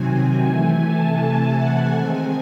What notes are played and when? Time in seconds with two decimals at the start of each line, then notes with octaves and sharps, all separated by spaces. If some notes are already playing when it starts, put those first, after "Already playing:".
Already playing: C3 D#3 F#3 C4 G#5
0.42 C3 E3 A3 G#5
0.80 A5
1.55 F#5
1.92 D#3 G#3 C4 G#5